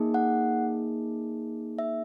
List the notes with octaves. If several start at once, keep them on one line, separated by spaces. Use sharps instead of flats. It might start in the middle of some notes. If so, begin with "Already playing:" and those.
Already playing: A#3 D#4 G#4
F#5
E5